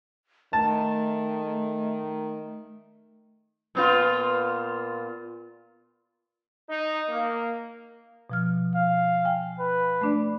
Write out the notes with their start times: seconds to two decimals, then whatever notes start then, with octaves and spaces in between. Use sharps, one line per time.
0.53 D#3 A3 A5
3.75 A#2 B3 F4
6.69 D#4
7.09 A#3
8.30 B2 F3 F6
8.75 F5
9.25 G5 G#5
9.59 B4
10.01 A3 D4 D5